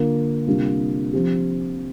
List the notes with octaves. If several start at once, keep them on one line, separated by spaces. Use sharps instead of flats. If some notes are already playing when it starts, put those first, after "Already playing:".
Already playing: D3 A#3 F4
C3 G3 A#3 D4 F4
F3 C4 G4